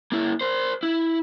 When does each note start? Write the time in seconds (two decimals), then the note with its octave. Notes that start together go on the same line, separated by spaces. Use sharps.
0.12 A#3 E4
0.41 A#4 C5
0.83 E4